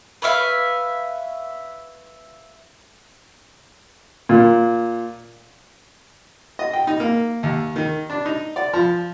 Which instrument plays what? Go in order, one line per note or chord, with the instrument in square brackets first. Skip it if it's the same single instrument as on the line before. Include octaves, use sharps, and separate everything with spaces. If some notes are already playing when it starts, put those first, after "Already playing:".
[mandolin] B4 C#5 E5 F5
[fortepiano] A#2
D#5
G5
D#4
A#3
D#2
D#3
D4
D#4
D5
F3